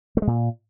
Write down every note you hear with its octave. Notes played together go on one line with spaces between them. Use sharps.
A3
G#3
A#2